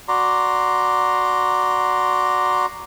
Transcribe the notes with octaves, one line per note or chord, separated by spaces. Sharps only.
F#4 D5 A#5 C6